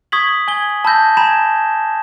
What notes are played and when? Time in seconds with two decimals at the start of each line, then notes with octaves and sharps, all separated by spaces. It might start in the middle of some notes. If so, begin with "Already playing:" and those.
0.12 C#6 D#6 G#6 B6 F#7
0.48 G#5 G#6 G7
0.85 A5 B5 E6 G6 A#6
1.17 G#5 A#5 B5 G#6 E7